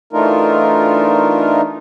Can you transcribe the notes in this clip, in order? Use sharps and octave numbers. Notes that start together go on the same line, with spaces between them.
E3 A3 D4 D#4 F4 A#4